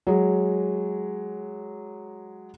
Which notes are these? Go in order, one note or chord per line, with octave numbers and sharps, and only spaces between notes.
F#3 G#3